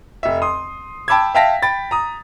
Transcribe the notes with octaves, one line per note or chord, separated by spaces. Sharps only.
F1 E5
C6 D#6
G5 A5 B5 D6 E6 G#6
E5 F5 G5 A5 A#6 B6
G5 B5 A6
A#5 D#6